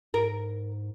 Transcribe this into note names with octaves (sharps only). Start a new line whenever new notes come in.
G#2 A#4